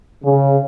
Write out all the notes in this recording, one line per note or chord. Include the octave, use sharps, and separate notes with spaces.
C#3